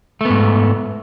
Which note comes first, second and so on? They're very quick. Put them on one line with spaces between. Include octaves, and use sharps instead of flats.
A3 B3 G#2